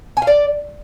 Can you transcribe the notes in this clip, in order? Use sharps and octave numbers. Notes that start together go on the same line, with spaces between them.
G#5
F5
D5